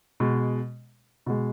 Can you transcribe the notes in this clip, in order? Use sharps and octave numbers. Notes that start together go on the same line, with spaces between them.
B2 G#3
B2 G#3